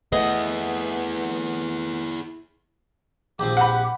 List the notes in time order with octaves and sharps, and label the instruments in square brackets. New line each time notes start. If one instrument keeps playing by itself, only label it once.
[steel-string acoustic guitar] A3 B3 D#5 [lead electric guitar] E4 G#4
[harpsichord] A#1 F3 C4 [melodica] G4
[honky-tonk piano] F#5 B5